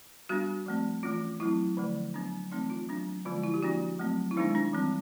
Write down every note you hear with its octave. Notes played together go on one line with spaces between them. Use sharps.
G3 B3 D4 F#4
F3 A3 C4
E3 A3 C#4 F4
F#3 A3 C4 E4
D3 F3 A3
F#3 B3 D4
E3 A3 C4 D#4
F4
F#3 B3 D4
D3 F3 G#3 B3 F4
E4
G4
F3 A#3 D4 F#4
F#3 A3 C4
E4
D#3 G#3 B3 D4 D#4
D4
E3 G3 C4